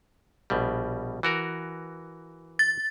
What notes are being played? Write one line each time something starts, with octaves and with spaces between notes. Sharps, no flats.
A#1 B2 G3
E3 F#4 A#4
A6